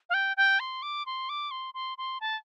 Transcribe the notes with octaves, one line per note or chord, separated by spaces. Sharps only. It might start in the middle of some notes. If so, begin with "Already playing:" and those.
F5
G5
G5
C6
D6
C6
D6
C6
C6
C6
A5